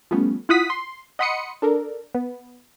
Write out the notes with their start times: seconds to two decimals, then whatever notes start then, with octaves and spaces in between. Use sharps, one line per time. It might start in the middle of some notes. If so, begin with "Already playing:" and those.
0.11 F3 G3 A3 B3 C#4
0.49 E4 F4 F#5 D#6 B6
0.70 C6
1.19 D#5 F#5 B5 C6 D#6 C#7
1.62 D4 A4 A#4
2.15 B3